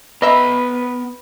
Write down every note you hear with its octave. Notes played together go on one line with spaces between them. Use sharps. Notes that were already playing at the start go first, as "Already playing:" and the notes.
B3 B4 D#5 E5 A#5 B5